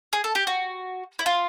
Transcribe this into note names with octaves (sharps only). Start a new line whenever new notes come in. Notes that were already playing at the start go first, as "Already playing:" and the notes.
G#4
A4
G4
F#4
E4
F4